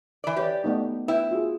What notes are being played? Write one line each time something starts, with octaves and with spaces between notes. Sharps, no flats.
E3 D5
G4 B4 C#5 D5
A3 B3 D#4
E4 B4 G5
F4 F#4 G#4